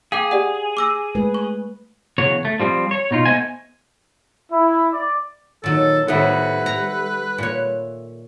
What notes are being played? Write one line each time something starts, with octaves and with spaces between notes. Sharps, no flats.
G#4 F5 G5 D6
G4 D5 F#5
D6 E6 A#6
G#3 A3 B4
C#6
E2 C#3 F#3 C#5
A3
F3 G3 C4
C#5
B2 D#4 F4
A3 B3 C5 D#5 G#5
E4
D5
A#2 D#3 F#3 A4
A2 D#3 G3 B3 A4 B4 E5 F#5
A#5
A#2 C#5